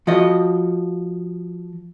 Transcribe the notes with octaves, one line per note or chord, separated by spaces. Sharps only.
F3 F#4 D#5